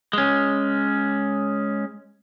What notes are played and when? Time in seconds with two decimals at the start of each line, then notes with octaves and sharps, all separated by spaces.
0.13 G#3 C#4